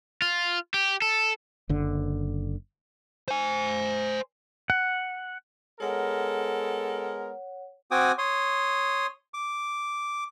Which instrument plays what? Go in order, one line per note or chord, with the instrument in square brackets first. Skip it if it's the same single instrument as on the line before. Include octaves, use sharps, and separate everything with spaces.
[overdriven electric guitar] F4
G4
A4
[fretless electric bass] F#1 D3
[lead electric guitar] C5 G#5
[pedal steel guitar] F#5
[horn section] G#3 B3 A#4 [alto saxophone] A4 [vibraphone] C#5 F#5
[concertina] C4 F#4 G5 G#5 D6 D#6
C#5 C6 D#6
D6